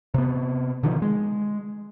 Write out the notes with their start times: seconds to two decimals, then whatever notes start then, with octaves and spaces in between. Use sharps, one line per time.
0.14 C3 B3
0.83 B2 D3 D#3 F3
1.02 G#3